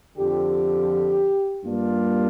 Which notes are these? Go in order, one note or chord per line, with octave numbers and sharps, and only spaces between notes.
F2 D3 F3 G4
G2 G3 A#3 D4 F4